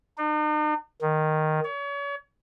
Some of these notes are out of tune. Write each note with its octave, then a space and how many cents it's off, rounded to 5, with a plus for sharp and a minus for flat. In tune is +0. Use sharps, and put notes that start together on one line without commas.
D#4 -45
D#3 -5
C#5 +35